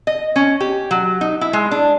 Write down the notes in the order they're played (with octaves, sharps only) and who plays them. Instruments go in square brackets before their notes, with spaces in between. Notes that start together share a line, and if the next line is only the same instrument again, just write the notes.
[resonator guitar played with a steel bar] D#5
C#4
G4
F#3
D#4
E4
G#3
D4